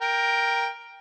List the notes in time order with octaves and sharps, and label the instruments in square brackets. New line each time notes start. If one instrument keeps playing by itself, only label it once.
[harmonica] A#4 G5